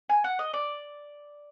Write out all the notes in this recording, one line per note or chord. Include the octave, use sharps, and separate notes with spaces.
G#5
F#5
D#5
D5